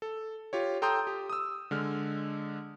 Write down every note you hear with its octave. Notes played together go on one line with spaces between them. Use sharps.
A4
F4 G4 C#5
A4 G5 A#5 C6 D#6 G6
G4
D#6 E6
D3 G#3 F6